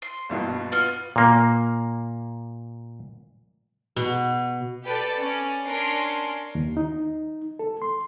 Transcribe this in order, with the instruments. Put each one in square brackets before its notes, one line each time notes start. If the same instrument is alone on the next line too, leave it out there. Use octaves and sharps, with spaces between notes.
[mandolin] C6
[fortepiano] A#1 G2 B2
[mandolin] B3 F4 F6
[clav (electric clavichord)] A#2 A#3
[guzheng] B2
[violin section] G4 A4 B4 D5 A5
C#4 D5
C#4 D4 A#4 C6
[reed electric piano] D#2
D#4
A4
C6